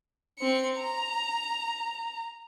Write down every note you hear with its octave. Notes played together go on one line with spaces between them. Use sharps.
C4 C#7
A#5